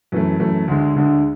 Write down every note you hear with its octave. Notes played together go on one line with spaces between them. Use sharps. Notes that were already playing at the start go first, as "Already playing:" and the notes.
F#2 E3 A3
F#2 E3 A3
D2 D3 G#3
D2 D3 G#3